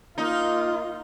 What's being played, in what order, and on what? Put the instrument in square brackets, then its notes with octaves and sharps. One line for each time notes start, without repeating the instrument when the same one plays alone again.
[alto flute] A#3 [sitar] D#4 [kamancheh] F4